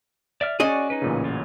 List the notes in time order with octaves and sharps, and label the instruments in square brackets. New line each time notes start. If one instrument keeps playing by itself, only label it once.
[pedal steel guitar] D5 E5 F6
[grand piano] C#4 [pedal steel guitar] F#4 D5 [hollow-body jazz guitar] G#4 D#5
[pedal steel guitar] D#4 B4
[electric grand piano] A1 A#2 C#3
[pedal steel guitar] F#3 F4